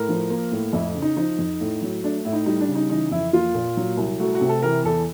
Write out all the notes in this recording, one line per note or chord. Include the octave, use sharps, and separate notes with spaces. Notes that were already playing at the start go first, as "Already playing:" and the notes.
Already playing: A2 A#4
F3
A#3
A2
F2 E4
C#3
D#4
F3 D#4
F2
A2
F#3
A3 D4
A2 E4
D#4
G3 D#4
D4
C#3
D#4
E3 D#4
F2 E4
A#3 F4
A#2
F#3
C2
A3 F#4
F#4
C3
A4
E3 A#4
E2 A4